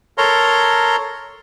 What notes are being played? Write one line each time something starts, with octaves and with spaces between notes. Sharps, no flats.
A4 A#4 C#5 A#5 C6